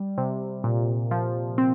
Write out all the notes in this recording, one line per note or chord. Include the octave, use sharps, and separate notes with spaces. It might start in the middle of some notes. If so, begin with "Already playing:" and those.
Already playing: G3
C3
A#2
F3
C4